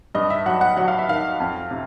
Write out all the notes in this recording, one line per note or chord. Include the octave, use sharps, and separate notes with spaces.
G2 D#5
E5
F#3 F#5
F#5
F#3 F#5
F5
E5
D#3 F5
F2
C3